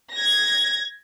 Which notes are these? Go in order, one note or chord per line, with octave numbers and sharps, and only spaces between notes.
G#6 A#6